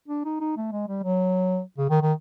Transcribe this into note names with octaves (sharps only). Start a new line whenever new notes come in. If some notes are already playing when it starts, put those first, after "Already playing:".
D4
D#4
D#4
A3
G#3
G3
F#3
C#3
D#3
D#3